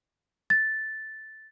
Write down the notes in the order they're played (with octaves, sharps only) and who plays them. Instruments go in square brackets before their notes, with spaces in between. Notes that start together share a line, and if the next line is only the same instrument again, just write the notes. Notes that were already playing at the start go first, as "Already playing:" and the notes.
[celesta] A6